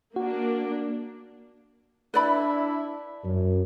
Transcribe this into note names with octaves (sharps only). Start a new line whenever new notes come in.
A#3 D4 F#4
D4 E4 B4 D5 B5
F#2